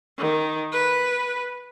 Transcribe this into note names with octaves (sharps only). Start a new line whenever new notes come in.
D#3
B4